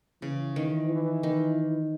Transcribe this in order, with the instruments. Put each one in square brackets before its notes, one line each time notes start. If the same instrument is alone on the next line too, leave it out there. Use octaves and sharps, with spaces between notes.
[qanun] C#3 [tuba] E3
[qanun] D#3 [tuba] E3
[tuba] E3
[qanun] D#3